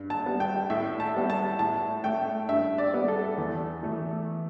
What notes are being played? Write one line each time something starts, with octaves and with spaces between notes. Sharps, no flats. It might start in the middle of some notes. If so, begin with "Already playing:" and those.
Already playing: G2
A5
G3 B3
G5
A2 E5
A5
G3 B3
A5
A2 A5
A3 G5
G2 E5
D5
G3 B3
A4
E2
E3 A3